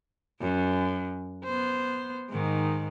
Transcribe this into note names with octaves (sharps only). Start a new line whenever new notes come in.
F#2
B3 C5
G#2 D#3